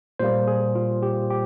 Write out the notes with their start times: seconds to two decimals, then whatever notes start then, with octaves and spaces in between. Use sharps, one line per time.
0.19 A#2 G3 A#3 C5
0.47 G#4
0.75 F4
1.03 G4
1.30 G4